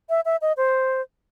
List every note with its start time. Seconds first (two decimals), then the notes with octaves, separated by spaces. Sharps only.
0.10 E5
0.25 E5
0.42 D#5
0.57 C5